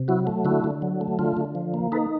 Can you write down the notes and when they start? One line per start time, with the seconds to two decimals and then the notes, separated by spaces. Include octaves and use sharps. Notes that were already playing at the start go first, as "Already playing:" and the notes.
Already playing: C3
0.08 F#3 E4 F#4
0.27 A3
0.45 D3 E4 F#4
0.64 D3
0.82 F#3
1.01 A3
1.19 D3 F4
1.37 D3
1.55 F3
1.74 A#3
1.92 D#4 A4 B4